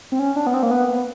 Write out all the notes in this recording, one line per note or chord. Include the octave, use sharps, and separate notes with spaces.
C4
C#4
D4
B3
C4
A#3
B3
B3